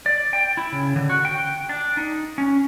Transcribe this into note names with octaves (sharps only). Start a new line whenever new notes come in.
D5
G5
E4
C#3
D3
F#4
G5
D4
D#4
C#4